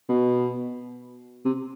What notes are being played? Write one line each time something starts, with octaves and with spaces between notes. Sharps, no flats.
B2
C3